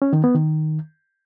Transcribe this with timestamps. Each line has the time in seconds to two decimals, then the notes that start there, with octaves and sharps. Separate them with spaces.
0.02 C#4
0.13 D#3
0.24 B3
0.35 D#3